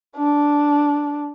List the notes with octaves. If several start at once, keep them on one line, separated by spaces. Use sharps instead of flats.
D4